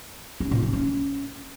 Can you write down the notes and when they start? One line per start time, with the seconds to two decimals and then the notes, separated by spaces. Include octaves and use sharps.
0.40 C#4
0.51 A#2
0.62 C4
0.73 C#4